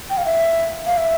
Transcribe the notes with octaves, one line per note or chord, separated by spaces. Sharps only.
G5
F5
E5
F5
E5